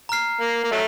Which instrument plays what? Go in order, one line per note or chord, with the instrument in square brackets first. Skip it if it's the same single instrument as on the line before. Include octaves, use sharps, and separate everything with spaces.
[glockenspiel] A#5 F6 C7
[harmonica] A#3
A#3
F#3 A3